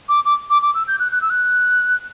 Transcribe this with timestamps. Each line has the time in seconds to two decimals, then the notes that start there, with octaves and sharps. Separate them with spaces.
0.08 D6
0.25 D6
0.50 D6
0.62 D6
0.74 E6
0.87 G6
1.00 F#6
1.12 F#6
1.22 E6
1.30 F#6